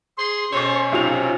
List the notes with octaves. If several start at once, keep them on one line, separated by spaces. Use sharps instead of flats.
G#4 C6
B2 C#4 A4 C5 C#5 C6 C#6
B1 C3 F4 F7